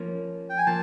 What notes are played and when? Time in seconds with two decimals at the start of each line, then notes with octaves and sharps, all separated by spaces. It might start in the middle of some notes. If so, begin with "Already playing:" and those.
Already playing: F3 A#3 C#4
0.50 G5
0.58 G#5
0.66 F3 A#3 A5